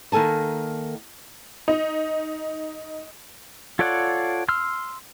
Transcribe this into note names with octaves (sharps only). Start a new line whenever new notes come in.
D#3 A#3 A4 G#5 A5
D#4
F4 A4 C#5 D5 F#5
C6 E6 F6